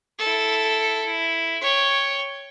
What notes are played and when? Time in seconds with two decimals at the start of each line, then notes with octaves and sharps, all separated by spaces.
0.19 E4 A4
1.05 E4
1.62 C#5 G5